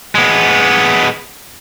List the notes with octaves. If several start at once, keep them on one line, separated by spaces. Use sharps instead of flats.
G#3 B3